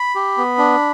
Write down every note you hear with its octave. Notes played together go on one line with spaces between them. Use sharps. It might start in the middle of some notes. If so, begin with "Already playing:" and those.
Already playing: B5
G4
B3
D4